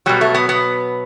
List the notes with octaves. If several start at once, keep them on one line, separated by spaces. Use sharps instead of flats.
B2 F#3 G3
A3
B3
B3